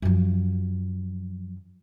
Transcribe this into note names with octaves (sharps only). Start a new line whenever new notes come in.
F#2 F3